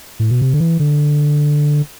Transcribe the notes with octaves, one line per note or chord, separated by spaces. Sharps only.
A2
B2
C3
D3
E3
D3